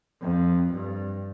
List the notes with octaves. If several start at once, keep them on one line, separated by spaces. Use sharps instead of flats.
F2
G2